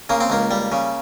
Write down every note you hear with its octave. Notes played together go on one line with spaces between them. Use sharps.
C#3 A#3
C4
C#2 A#3
G3
C#3